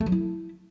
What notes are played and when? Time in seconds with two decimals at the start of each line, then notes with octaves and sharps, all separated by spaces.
0.01 A3
0.06 F#3
0.12 E4